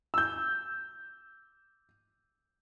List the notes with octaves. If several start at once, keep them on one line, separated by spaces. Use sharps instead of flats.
E6 G6